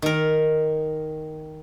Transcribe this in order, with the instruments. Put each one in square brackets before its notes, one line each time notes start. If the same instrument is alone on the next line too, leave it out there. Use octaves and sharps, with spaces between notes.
[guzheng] D#3 A#4